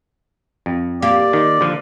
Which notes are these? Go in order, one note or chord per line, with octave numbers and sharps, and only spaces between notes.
F2
A#3 G4 D5
D#3
D3 F3